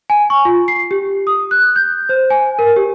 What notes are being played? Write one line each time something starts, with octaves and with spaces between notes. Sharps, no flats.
G#5
C#6
F4
C7
G4
D#6
F#6
G6
C5
G#5
A#4
G4